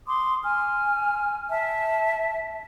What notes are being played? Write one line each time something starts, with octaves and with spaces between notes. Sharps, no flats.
C6 D6 D#6
G#5 F6
E5 A5